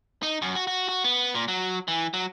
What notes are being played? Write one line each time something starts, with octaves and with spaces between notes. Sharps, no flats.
D#4
F#2
F#4
F#4
F#4
B3
A#2
F#3
E3
F#3